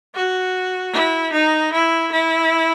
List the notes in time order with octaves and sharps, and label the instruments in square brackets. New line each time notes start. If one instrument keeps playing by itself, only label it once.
[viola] F#4
E4
D#4
E4
E4